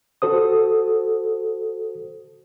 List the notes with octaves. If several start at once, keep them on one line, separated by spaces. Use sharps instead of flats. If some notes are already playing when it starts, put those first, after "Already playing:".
F#4 A4 C5 D#6